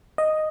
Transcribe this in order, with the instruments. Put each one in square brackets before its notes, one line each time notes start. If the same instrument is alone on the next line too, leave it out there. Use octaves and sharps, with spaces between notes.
[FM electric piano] D#5